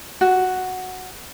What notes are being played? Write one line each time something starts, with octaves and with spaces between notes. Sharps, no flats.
F#4